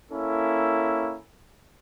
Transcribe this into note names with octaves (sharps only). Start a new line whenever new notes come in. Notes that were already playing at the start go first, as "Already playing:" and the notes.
A#3 C#4 E4 A4